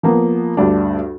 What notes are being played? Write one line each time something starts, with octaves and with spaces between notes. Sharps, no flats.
F3 A#3 B3
D2 G2 D4